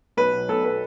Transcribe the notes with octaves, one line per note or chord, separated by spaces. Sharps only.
B1 B4
B2 F#3
B1 A4
B2 F#3 B4